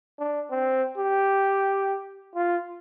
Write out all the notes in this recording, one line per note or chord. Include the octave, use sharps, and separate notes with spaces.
D4
C4
G4
F4